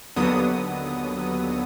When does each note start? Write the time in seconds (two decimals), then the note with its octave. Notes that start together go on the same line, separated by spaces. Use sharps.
0.16 D#2 D3 F#3 B3 D#6